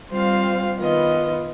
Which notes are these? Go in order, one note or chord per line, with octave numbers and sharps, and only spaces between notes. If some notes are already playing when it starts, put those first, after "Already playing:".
G3 C4 F4 C5 F5
D#3 B3 F4 B4 D#5